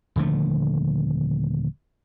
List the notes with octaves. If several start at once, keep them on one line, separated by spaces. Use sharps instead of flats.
D#1 D3 F3 A3